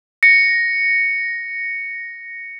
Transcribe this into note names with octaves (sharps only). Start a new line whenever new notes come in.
A#6 C#7